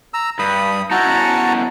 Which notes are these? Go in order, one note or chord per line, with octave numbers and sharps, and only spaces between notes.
A#5 E6
G2 B5 D#6
D#4 E4 F#4 A5 A#5
E2 C#4